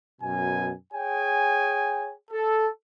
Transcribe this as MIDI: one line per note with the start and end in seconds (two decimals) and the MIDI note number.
0.22 0.72 42
0.22 0.72 47
0.22 0.72 80
0.93 2.12 68
0.93 2.12 73
0.93 2.12 79
0.93 2.12 80
2.31 2.67 69